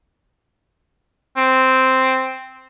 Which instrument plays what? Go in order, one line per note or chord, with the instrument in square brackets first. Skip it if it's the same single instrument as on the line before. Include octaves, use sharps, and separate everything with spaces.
[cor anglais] C4